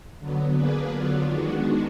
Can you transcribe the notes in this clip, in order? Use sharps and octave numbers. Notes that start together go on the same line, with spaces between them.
D3 F#3 B3
A#3 D4 G#4 B4
D3 F#3 B3 D4 F4
D#3 G#3 B3 D4 F#4